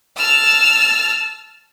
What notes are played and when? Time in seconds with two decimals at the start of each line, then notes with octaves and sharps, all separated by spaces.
0.17 A5 E6 F6